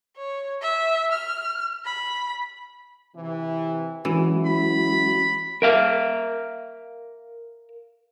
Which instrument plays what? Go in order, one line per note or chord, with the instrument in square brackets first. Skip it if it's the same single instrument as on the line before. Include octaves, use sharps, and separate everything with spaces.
[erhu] C#5
E5
F6
B5
[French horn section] C3 E3
[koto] E3 [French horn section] F#3 E4 [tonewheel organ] G#3 C#4 F#4
[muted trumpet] B5
[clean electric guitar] A#4 E5 F5